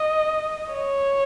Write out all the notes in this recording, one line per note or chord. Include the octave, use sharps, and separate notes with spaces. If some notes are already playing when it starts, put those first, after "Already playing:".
Already playing: D#5
C#5